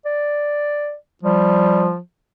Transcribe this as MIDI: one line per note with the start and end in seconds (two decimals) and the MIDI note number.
0.06 0.95 74
1.23 1.98 53
1.23 1.90 55